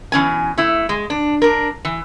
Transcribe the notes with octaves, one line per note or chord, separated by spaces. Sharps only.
B2 E3 C#4 G#5
A3 E4
G#3
D4
D4 A#4
E3